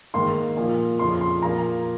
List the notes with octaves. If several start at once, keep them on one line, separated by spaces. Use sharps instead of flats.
G#2 D#3 A#3 C6
A#2 F3 A#3
F2 C#3 F3 C6
C6
A#2 F3 A#3 A#5